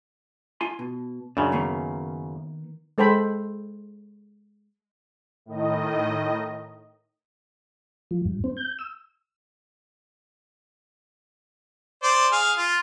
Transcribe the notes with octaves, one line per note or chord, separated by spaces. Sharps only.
F4 G#5 C6
B2
F#2 C#3 D4
D#3 A#3 B3
G#3 A4 C5 G5 B5
A2 D#3 D#5
F3
G2
C4
G6
E6
C5 D5
G#4 F5
F4